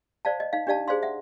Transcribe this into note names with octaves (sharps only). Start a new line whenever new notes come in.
C5 D5 F5 A5
D#5
D#4 F5
D4 G4 D5 F5 A5
G#4 C5 D5 F5 C6
E5 F#5